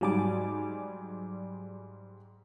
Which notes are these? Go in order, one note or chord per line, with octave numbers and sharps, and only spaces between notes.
G#2 F#3 G3 D5 G#5 D6